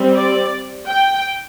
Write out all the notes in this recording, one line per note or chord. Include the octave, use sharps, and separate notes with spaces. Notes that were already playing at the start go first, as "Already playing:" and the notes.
Already playing: G3 C4
D5
G5